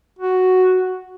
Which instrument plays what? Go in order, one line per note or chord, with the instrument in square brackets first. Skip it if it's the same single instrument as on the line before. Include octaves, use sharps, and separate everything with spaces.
[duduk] F#4